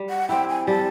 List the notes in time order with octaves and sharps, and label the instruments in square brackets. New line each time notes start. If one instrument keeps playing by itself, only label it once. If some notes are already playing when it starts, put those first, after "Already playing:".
Already playing: [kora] G3
[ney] F#5
[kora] C4 E4 [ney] G5
[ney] G#5
[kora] G3 [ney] A5